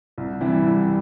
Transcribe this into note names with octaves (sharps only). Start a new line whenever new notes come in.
C2
C3 E3 G3 E4
C2